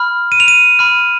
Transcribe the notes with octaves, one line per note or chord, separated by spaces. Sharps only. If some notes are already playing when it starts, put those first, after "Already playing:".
Already playing: B5 F6
D#7
F7
D#7
B5 F6